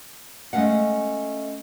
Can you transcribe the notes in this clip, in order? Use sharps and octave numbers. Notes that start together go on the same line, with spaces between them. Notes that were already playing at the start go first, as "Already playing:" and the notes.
G#3 A3 C4 C#4 F5 F#5